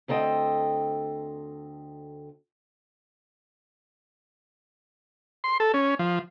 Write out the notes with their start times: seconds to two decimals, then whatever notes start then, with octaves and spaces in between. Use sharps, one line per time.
0.08 D2 C4 A4 D#5 G5
5.44 C6
5.60 A4
5.74 C#4
5.99 F3